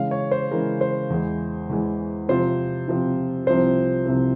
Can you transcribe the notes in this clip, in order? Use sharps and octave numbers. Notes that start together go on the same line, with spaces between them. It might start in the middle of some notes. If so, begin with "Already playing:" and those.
Already playing: C#3 E3 G#3 F5
C#5
C5
C#3 E3 G#3 A#4
C5
E2 E3 G#3
E2 E3 G#3
C3 F3 C4 F4 C5
C3 F3 C4 F4
C2 C3 F3 C4 C5
C2 C3 F3 C4